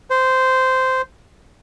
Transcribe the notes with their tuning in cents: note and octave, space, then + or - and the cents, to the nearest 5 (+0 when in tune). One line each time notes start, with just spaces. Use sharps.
C5 -10